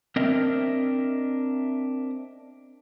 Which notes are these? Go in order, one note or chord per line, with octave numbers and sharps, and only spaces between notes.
C4 D4 A#4 D#5 E5